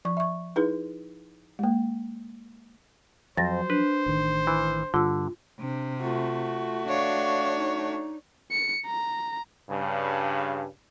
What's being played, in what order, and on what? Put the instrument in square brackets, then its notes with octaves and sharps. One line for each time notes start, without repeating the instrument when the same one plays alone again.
[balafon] F3 C#6
E5 C#6
D#4 E4 G#4 B4
G#3 A#3
[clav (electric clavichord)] F2 [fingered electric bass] F3 F#3 [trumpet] C5 [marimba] A6 A#6
[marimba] D4 [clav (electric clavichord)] B4
[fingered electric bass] A1 D#3
[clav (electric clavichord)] E3
[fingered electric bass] G2 [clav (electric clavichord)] D3 [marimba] F4 E6
[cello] C3 [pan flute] D4
[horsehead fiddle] A3 F#4 [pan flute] F4
[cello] D4 C#5 [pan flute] F5
[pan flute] D#4
[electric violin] C#7
A#5
[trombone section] G2 C#3